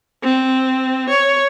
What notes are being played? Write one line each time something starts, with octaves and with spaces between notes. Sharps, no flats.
C4
C#5